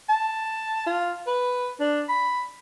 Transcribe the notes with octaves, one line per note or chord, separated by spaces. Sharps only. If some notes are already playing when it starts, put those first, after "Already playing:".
A5
F4
B4
D4
B5